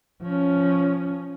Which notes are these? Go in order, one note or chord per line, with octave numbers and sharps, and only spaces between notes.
F3 C#4